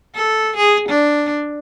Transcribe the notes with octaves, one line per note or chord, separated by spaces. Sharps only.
A4
G#4
D4